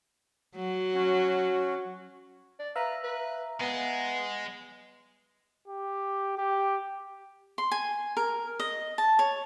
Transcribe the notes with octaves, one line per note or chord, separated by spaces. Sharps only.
F#3
C#4 F#4
D5
B4 E5 F5 A#5
B4
G#3 B3
G4
G4
C6
G#5
A#4
D#5
A5
C#5